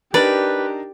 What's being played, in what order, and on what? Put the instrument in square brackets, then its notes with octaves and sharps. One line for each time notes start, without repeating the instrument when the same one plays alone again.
[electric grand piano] D4 D#4 A#4 [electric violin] G4 [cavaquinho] B4 [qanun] D5